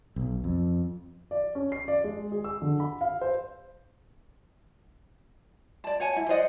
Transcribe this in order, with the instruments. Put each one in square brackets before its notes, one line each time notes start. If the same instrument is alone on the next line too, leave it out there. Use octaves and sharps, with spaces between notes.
[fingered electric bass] B1
F2
[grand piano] D5
C#4
C7
D5
G#3
G#4
E6
D3
B5
F5
C5
[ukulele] D5 A5
C#5 F#5 G#5 A5
E4
C5 D5 D#5 F#5